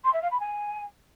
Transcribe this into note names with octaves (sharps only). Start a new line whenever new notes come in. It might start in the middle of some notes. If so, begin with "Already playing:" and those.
C6
E5
F5
B5
G#5